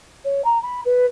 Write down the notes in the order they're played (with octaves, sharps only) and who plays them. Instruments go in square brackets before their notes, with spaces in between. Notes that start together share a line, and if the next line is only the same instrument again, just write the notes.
[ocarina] C#5
A#5
B5
B4